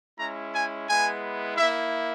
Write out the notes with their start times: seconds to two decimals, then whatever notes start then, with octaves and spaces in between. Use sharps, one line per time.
0.17 G#3 C#4 E4 A#5
0.53 G#5
0.87 G#3 B3 E4 G#5
1.57 A#3 E4 E5